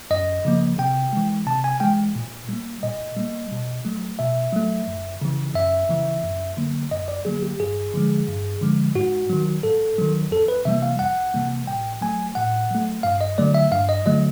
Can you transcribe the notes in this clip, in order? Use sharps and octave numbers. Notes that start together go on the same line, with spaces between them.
F#2 D#5
C#3 F3 A#3
C3 G5
E3 G#3
C3 A5
G#5
E3 G#3 G5
A#2
G3 A#3
A#2 D#5
G3 A#3
B2
F#3 A3
B2 E5
F#3 A3
F#2
C#3 E3
F#2 E5
C#3 E3
F#2
D3 F#3 A#3
F#2 D#5
D5
D3 F#3 A#3 G#4
G4
G2 G#4
D3 F3 G#3
G2
D3 F3 G#3
G#2 F#4
D#3 F#3
G#2 A4
D#3 F#3
F2 A4
B4
C3 E3 G3 A#3 E5
F5
F2 F#5
C3 E3 G3 A#3
A2 G5
F#3 A3 G#5
A2 F#5
F#3 A3
G2 F5
D#5
D3 F#3 A3 D5
E5
G2 F5
D#5
D3 F#3 A3 D#5